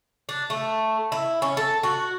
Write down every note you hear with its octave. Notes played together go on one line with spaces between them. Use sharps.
D4
A3
E4
C#4
A4
F#4